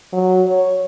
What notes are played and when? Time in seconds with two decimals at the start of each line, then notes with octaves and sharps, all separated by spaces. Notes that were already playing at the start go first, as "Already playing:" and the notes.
0.13 F#3
0.47 C#5